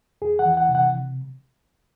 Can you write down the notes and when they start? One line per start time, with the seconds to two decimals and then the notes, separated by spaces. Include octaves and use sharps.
0.22 E2 G#4
0.39 F#5
0.45 E3
0.57 F#5
0.69 C3
0.75 F#5